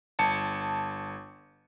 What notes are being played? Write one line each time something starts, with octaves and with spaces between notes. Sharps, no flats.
G1 A5 C#7